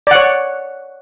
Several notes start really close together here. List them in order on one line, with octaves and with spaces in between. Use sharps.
D5 F#5 C#5